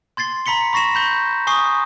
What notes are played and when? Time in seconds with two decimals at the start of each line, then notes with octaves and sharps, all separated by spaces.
0.17 C6 G#6 A6 C7 G7
0.46 A#5 B5 B6 C#7 G7
0.73 B5 C#6 A#6 C7 E7
0.95 B5 G6 G7
1.47 G#5 C#6 D#6 C7 G7